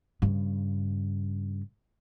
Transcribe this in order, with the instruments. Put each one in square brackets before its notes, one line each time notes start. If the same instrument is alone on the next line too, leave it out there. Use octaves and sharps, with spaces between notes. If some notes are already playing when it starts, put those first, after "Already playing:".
[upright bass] G2 C#3